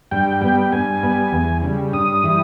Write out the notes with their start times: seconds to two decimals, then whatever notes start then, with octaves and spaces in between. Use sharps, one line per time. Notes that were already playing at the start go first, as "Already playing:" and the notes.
0.11 G2 G5
0.41 G3 B3 G5
0.72 G2 G#5
1.03 G3 B3
1.32 E2
1.63 C#3 G3
1.93 G2 D#6
2.24 E3 G3